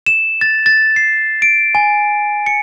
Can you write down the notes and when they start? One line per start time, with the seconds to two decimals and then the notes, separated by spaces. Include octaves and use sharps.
0.06 E7
0.41 A6
0.66 A6
0.96 C7
1.42 D7
1.75 G#5
2.46 C#7